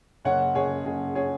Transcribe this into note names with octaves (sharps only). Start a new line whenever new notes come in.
F#1 C#5 F#5
F#1 G#4 C#5
F#1 G#4
G#4 C#5